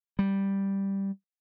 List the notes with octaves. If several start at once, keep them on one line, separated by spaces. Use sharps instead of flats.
G3